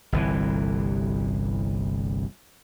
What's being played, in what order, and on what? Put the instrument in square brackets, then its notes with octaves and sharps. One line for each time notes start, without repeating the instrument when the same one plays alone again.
[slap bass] G1 C2 E3